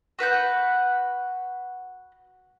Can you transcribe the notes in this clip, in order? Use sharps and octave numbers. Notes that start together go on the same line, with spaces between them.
F#4 B4 F#5 G6